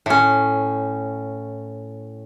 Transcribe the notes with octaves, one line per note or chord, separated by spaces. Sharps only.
A2 C#4